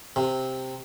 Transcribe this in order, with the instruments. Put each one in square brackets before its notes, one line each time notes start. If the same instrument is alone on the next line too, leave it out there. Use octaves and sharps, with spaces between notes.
[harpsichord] C3